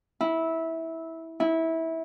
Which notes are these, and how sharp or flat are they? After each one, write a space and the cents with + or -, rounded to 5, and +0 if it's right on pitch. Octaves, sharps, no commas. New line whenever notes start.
E4 -15
E4 -20